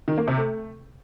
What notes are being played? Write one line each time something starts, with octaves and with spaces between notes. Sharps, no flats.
D#3
A#3
C3
A3